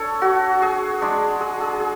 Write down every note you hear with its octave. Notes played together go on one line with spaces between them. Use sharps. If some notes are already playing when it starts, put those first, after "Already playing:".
Already playing: D4 A4 C#5
F#4
G#4
G#3 D4
G#4
G#4
G#4